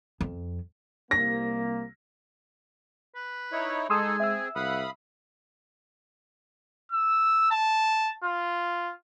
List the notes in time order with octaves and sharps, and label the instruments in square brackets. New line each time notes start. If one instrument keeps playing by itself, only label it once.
[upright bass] F2
[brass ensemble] C2 A#3 [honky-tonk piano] A#6
[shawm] B4
[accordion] D#4 E4 C#5
[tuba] G#3 [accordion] D#4 G#4 A4 [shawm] G#5 [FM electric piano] C6 D#6 E6
[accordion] C4 G#4 [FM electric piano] E5 E6
[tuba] C2 [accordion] F5 B5 D#6 [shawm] F#5
[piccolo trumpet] E6
A5
F4